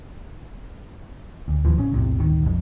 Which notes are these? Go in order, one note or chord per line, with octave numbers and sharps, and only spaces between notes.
D2
D1 D#2 E3 F3
A1 C#3 C#4
B1 E2 A2 C3
D1 G1 D#3
B1 F2